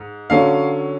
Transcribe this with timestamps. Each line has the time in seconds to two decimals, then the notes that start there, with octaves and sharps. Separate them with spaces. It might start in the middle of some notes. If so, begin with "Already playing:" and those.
Already playing: G#2
0.30 D3 F#3 C#4 F5